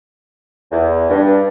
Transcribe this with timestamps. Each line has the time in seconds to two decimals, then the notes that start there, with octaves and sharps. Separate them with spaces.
0.72 E2
1.09 G2